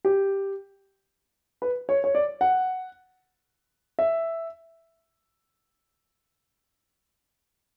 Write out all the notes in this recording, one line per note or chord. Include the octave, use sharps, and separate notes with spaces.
G4
B4
C#5
C#5
D5
F#5
E5